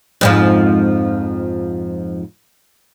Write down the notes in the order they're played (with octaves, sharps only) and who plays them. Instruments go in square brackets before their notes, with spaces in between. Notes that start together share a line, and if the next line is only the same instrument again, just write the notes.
[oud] F2 G#2 F3